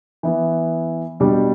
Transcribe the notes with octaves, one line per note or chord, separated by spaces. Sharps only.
E3 B3 E4
B2 G3 D4 G4